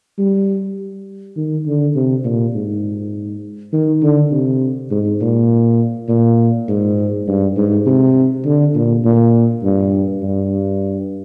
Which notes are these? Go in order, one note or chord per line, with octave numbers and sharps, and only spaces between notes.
G3
D#3
D3
C3
A#2
G#2
D#3
D3
C3
G#2
A#2
A#2
G#2
G2
G#2
C3
D3
A#2
A#2
G2
G2